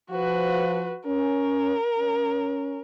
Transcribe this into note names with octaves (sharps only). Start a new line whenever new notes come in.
F3 F#4 B4
C#4 A#4
C#4